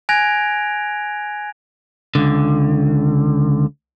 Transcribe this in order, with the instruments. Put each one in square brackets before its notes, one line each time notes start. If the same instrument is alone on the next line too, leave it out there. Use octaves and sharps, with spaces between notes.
[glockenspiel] G#5 F#6 G#6 A#6 D7 F7
[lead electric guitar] C#2 D3